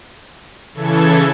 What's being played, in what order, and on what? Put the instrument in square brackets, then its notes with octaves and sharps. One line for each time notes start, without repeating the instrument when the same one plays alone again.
[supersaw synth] C#3 E3 A4 G#6